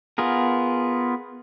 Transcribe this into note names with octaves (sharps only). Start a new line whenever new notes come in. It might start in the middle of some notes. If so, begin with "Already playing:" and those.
B3 F4 G#4 A#4